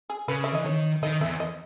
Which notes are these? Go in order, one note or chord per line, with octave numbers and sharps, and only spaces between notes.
G#4
C#3 B4
E5
E3 D#5
D#3 C#5
D#3 D#5
E2 E5
D#5